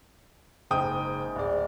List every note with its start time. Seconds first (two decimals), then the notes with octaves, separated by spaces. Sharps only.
0.71 F#1 G#2 G5 D#6
1.35 D1 D5